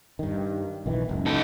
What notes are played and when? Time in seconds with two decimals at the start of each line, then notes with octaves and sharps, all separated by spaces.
0.19 G2 D#3
0.86 B1 D#3 E3
1.09 F#1 C#2
1.26 D#4 A4